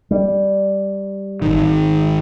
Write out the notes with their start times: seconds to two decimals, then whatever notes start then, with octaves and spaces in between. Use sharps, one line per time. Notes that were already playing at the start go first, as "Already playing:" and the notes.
0.11 G3
1.42 G#1 D#3